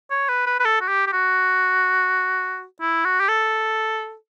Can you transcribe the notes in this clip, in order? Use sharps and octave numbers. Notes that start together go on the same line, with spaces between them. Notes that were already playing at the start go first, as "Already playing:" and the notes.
C#5
B4
B4
B4
A4
F#4
G4
G4
F#4
E4
F#4
G4
A4